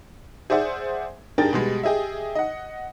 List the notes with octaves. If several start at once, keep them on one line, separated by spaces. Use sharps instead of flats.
G#4 C5 D5 E5 F#5
G2 D4 G#4 A#4 G5 A6
B2 G3 G#3
G4 G#4 D#5 E5
D#5 F#5